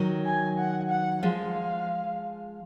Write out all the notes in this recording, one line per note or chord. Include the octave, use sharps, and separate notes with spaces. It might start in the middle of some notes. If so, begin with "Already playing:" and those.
Already playing: D#3 F#3
G#5
F#5
F#5
F3 G#3 F5